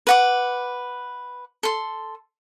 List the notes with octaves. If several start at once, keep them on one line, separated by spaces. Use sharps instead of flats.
B4 F#5 D6
A4 C6